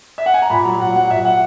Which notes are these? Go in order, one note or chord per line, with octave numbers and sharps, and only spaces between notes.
E5
F#5
G#5
A#5
A#2 B5
F#3 A#5
A#2 F#5
F#3 F#5
A#2 E5
F#3 F#5